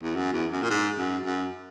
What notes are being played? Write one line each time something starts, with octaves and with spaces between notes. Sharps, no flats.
E2
F#2
E2
F#2
A#2
G#2
F#2
F#2